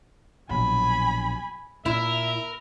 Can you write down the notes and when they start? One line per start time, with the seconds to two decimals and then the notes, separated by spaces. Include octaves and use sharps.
0.50 A#1 B2 F#3 G#5 B5
1.86 A#2 E4 A#4 E5